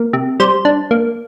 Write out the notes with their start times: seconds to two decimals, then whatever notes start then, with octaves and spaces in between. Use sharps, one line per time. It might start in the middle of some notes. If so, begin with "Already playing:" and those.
Already playing: A#3
0.13 C3
0.40 G3 C5
0.65 D4
0.91 A#3